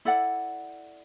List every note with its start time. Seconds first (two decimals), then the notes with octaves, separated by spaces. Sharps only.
0.05 E4 A4 D5 F#5